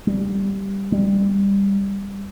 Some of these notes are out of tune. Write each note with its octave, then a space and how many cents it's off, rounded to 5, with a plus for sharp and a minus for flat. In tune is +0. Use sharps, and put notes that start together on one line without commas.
G3 +5
G3 +15